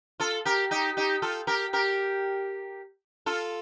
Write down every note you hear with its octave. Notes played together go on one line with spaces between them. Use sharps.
F4 A4
G4 A#4
D#4 G4
D#4 G4
F4 A4
G4 A#4
G4 A#4
F4 A4